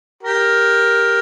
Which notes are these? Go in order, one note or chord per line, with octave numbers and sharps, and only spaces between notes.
G4 A#4